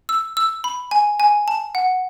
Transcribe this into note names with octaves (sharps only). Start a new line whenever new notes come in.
E6
E6
B5
G#5
G#5
A5
F#5